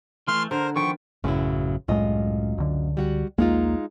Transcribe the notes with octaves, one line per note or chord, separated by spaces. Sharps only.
E3 A3 C6 F6
D3 A#4 C5
D#3 F3 B3 G5 C#6
A1 F#2 C#3 F#3 E4
C2 F#2 A2 G#3 F4 D#5
C#2 D3
G3 F#4 F#5
A#1 D#2 G#3 A#3 D#4 F4